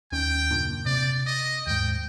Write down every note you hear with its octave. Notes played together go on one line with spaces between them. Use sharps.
D#2 D#3 C#4 G5
F#1 A#2 D4
C3 D5
D#5
D#2 G#2 G5